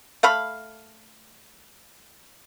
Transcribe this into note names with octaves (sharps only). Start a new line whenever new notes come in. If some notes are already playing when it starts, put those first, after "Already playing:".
A3 F5 B5